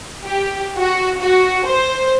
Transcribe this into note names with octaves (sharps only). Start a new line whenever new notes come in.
G4
F#4
F#4
C5